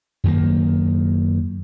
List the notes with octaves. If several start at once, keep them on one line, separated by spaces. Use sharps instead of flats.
F#2 D#3 A#3